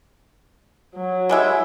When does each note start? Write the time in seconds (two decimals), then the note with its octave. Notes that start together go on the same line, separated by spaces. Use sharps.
0.96 F#3
1.29 G3 G#3 E4